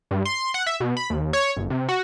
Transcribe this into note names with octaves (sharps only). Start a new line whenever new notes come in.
G2
C6
F#5
E5
B2
B5
D#2
C#5
G1
C3
F#4